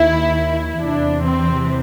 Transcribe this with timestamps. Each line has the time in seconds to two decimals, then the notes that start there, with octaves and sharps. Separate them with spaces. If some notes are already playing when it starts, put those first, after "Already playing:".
Already playing: D#2 D#3 E4
0.81 E2 C3 E3 D4
1.26 C4